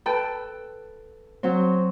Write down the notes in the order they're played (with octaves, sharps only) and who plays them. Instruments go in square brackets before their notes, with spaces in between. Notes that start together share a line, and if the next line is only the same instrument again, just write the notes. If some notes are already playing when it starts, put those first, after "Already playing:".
[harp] A4 [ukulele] B4 G5 A5
[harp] F#3 C4